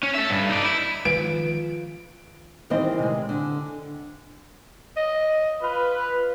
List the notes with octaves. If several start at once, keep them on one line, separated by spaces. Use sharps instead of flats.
C#4
A4 E5
G2
D#4 D5
E4
D#3 F3 G#3 F4 B4 D7
D#3 E3 G3 C4 C5 D#5
C3 G#3
D3
D#5
F4 B4